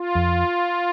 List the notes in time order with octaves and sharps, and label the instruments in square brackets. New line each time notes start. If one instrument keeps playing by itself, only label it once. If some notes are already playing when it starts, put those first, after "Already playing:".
Already playing: [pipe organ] F4
[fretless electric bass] F2